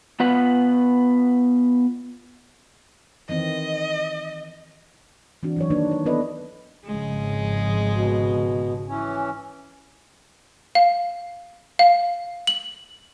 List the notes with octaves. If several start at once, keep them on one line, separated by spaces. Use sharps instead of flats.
B3 F4 B4 F#5
D#3 E3 C4 D#5
E3 C4 D4 F#4
E3 F#3 C#5
D#3 E3 A#3 D4 D#4 B4
C#5
B3 E4 A4 B4 D5 D#5
G#1 C#3 F3 G#3
B2
E3 C#4
F5
F5
F#7